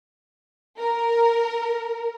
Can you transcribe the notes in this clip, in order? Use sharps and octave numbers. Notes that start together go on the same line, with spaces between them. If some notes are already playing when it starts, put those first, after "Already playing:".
A#4